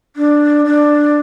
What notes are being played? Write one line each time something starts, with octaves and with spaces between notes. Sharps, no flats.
D4
D4